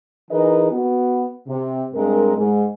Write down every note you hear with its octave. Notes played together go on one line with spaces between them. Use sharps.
E3 D#4 G#4 A#4 B4 D#5
B3 F#4
C3
G2 G#3 C4 A#4
G#2